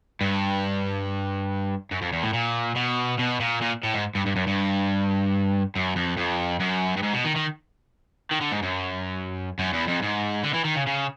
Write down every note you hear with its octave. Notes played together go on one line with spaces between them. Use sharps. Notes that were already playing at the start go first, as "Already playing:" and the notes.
G2
F#2
F2
E2
A2
A#2
B2
B2
A#2
A#2
A2
G#2
G2
G2
F#2
G2
F#2
F2
F2
F#2
G2
G#2
B2
D#3
D#3
D#3
D3
G#2
F#2
F#2
E2
F2
G#2
D3
E3
D#3
C#3
C#3